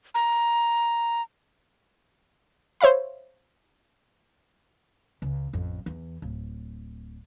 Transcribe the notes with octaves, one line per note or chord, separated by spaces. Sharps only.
A#5
C5 C#5 E5 F5 B5
C#2
A1 F2
E2
D1